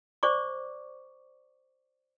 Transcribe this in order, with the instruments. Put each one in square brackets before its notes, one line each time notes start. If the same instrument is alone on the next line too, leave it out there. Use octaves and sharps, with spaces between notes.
[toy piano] C5 D5 C#6 D6